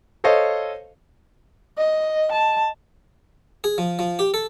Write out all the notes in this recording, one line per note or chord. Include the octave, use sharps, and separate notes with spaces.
A4 C5 C#5 D#5 F5
D#5
A5
G#4
F3
F3
G4
A4